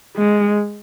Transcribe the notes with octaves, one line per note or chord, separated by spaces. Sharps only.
G#3